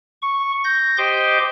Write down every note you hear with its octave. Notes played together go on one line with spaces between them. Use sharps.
C#6
G6 A#6
G4 C5 D#5 C6 D6